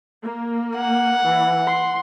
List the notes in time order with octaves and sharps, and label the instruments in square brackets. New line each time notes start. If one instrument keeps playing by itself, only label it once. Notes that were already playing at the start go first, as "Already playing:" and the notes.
[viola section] A#3
[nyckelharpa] F#5
[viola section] E3
C6